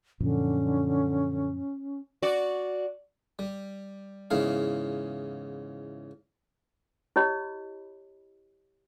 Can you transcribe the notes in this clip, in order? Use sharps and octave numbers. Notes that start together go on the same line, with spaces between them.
F#2 A#2 D3 F3 C#4
F#4 D5
G3
E2 G#2 C#3 E4 F5
E4 G4 C#5 D#5 B5